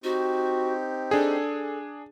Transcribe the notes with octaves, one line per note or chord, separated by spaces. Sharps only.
C4 D#4 F#4 G4
D4 G#4 A4